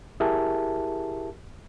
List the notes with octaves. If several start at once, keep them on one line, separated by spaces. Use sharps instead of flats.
E4 G4 G#4 A#4 E5 A5